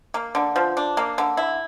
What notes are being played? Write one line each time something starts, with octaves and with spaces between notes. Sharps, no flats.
A#3
D3
F3
D4
A#3
D3
E4